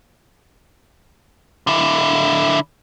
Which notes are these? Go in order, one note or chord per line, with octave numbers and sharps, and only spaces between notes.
D3 E4